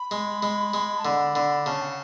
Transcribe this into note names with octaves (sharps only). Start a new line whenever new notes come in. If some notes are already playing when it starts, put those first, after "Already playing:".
Already playing: B5
G#3
G#3
G#3
A5
D3 B5
D3
C#3 A5
F#5